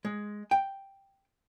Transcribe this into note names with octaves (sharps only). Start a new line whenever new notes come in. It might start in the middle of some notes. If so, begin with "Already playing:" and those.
G#3
G5